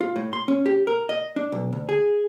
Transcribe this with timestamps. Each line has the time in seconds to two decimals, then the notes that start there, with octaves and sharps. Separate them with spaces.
0.01 F4
0.16 A2
0.33 C6
0.48 C#4
0.66 G4
0.87 A#4
1.09 D#5
1.36 D4
1.52 B1
1.73 D2
1.89 G#4